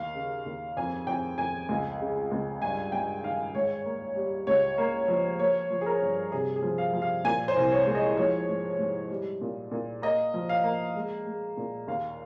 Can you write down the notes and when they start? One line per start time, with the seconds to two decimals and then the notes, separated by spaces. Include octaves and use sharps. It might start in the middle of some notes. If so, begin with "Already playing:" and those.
Already playing: D#2 F5
0.15 C#3
0.46 D#2
0.77 F2 G#5
1.07 F2 G5
1.38 F2 G#5
1.69 C#2
2.01 C#3
2.31 C#2
2.62 G2 G#5
2.92 G2 G5
3.23 D#3 F5
3.54 G#2 C#5
3.86 A#3
4.16 G3
4.47 C#2 C#5
4.78 A#3
5.08 F3
5.39 A#3 C#5
5.70 F3
5.81 G#4
5.86 A#4
6.02 G2
6.32 C3 G#4
6.56 G#4
6.62 F3
6.78 F5
6.93 F3
7.02 F5
7.24 A#2 G#5
7.48 C5
7.56 C2
7.72 C#5
7.86 G#3
7.95 D#5
8.17 F3 C#5
8.49 G#2
8.79 G#2
9.11 G3
9.41 A#2
9.71 A#2
10.02 A#3 D#5
10.34 F3
10.49 F5
10.64 A#3
10.96 G#3
11.26 G#3
11.57 A#2
11.87 D#2 F5